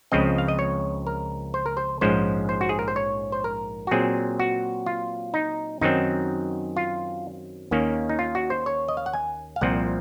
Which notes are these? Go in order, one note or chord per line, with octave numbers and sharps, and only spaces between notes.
C#2 C#3 F3 C4 D#5
F5
D#5
C#5
A#4
C5
A#4
C5
A#1 G#2 F3 G#3 C#4 C5
C5
F#4
G#4
A#4
C5
C#5
C5
A#4
F#4
A#2 F#3 C4 G#4
F#4
F4
D#4
F#2 D#3 F#3 C4 D#4
F4
D#2 D#3 A#3 C#4
D#4
F4
F#4
C5
C#5
D#5
F5
F#5
G#5
F5
C2 A#2 F3 C4 F#5